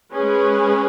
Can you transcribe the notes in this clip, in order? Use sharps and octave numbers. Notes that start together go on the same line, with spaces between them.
G#3 C#4 G#4 B4